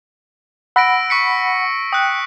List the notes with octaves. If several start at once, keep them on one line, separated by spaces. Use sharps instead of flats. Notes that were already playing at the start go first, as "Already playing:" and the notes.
F#5 B5 E6 A#6 D7
C#6 B6 C#7
G5 D#6 F#6